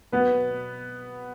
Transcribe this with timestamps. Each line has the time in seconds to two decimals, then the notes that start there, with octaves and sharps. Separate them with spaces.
0.12 F#3 B3 B4
0.32 B2
0.50 B2